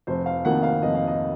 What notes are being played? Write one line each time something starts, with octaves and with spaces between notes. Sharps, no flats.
F1 C5
F5
F2 D#3 A#3 F#5
F5
F1 D#5
F5
D#5